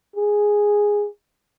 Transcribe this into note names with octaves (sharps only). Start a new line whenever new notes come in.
G#4